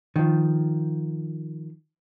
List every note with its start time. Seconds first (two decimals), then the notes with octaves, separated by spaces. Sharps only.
0.16 D#3 F3